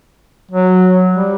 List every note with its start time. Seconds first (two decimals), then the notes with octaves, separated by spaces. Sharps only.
0.51 F#3
1.13 G3